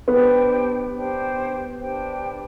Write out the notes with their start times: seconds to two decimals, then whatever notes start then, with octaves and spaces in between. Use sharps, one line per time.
0.08 B3 D4 G4 C5 G5
0.93 D4 G4 C5 G5
1.77 D4 G4 C5 G5